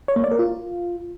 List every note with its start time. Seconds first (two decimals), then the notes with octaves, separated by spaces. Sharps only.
0.08 C#5
0.16 A#3
0.24 D5
0.31 A#4
0.39 F4